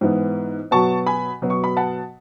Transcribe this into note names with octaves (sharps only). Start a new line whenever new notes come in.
G#2 E3 B3
B2 F#3 B3 A5 C#6
G#5 B5
B2 F#3 B3
C#6
B5
F#5 A5